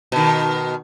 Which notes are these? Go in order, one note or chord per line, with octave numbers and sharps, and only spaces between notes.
B2 D#3